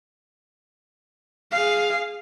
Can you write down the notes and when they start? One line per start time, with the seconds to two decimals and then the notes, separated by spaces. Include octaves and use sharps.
1.52 G#4 F5